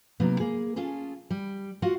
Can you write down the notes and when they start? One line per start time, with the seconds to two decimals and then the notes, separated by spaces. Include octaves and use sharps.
0.20 C3 F#3 A#3 B3 D#4
0.40 A#3 G#4
0.76 C#4 F4 G#4 A4
1.30 G3
1.82 F4 F#4 F5 F#5